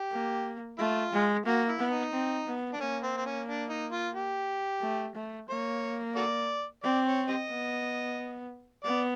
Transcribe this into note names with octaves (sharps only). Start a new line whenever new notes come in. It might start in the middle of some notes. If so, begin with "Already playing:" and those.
Already playing: G4
A#3
A3 F4
G#3
A#3 F#4
E4
B3
D#4
C4
B3
D4
A#3 C#4
C4
C4
C#4
D4
D#4
F4
G4
A3
A3
A#3 C#5
F#4 A4 D5
C4 D5
C#5
G4 C5 D#5
B3
B3 D5